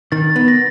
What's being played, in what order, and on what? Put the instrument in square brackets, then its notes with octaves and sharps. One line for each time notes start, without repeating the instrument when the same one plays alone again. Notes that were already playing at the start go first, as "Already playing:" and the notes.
[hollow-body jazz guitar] D#3 [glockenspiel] A6
[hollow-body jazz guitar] B3
[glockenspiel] A#6